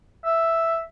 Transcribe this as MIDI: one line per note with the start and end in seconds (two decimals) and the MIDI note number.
0.25 0.81 76